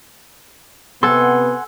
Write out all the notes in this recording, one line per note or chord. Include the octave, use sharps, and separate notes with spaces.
C3 B3 A4 F#5 G#5 C6